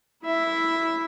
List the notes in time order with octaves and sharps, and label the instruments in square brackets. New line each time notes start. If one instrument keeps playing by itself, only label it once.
[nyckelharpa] E4 E5